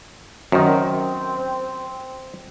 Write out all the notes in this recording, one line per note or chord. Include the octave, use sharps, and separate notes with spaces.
F#2 D#3 C4